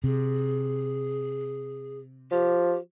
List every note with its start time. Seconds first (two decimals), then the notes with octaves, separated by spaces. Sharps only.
0.04 C3 G#4
2.31 F3 G4